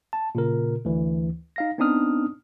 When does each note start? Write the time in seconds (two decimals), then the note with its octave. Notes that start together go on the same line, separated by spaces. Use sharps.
0.13 A5
0.35 A#2 C#3 A#4
0.85 D2 E3
1.56 D#4 F5 A#6
1.78 B3 C4 D4 D#4 D#6 F6